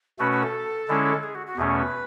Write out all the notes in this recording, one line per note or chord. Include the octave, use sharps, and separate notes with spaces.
B2 A3 C#4 F#4 B4
B4
A4
D3 G#3 C#4 E4
G#4
F#4
F#4
E2 B2 A3 C#4 G#4
B4